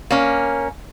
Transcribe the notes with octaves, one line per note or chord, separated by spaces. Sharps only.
A#3 C#4